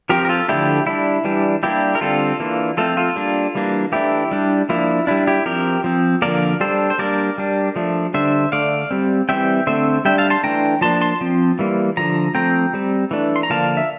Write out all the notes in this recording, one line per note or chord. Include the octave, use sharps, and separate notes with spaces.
F3 C4 G4 A#4
A#4
F4 A4
D3 F3 A3 D4 E4 G4
G3 D4 E4
E3 G3 D4
G3 A#3 D4 E4 G4
A#4
D3 G3 C4 F4 A4
E3 A#3 D4
F3 A3 C4 F4 A4
F4 A4
G3 A#3 D4
E3 G3 A#3 D4
E3 A3 D4 E4 G4
G3 D4
F3 A#3 D4 E4
G3 D4 E4
E4 G4
F3 C4 G4 A#4
F3 C4
D3 F3 A#3 A#4 D5
G3 D4 A4 C5
C5
G3 A#3 D4 A#4 D5
G3 D4
F3 A3 D4
D3 G3 D4 C5 E5
D3 A3 D4 D5 F5
G3 C4
E3 G3 C4 E5 G5
D3 A3 C4 C5 E5
G3 D4 E5 G5
F5 A5
A5 C6
E3 A3 D4 G5 A#5
F3 A#3 D4 A5 C6
A5 C6
F3 C4
E3 G3 A#3
D3 F3 A#5
F3 A3 C4 G5 A#5
G3 C4
E3 A3 D4
C6
A#5
D3 F3 A#3 D4 F5 A5
E5